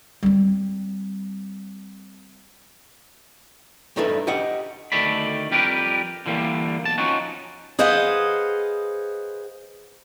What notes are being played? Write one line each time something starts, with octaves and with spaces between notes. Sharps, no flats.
G3 C4
G2 D4 D#4 A4 B4 E5
G4 D#5 F#5
D2 D#3 A3 D5 B5
F2 G3 G4 A#4 B4
D3 E3 G3 A#3
B1 A5
F3 C#4 D#4 F#4
G#4 B4 C5 D#5 F5 F#5